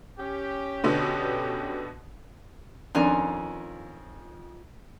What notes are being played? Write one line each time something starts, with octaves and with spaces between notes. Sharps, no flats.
C#4 G4
B2 D3 B3
F2 D#3 C#4 D4 F4 G#5 A#5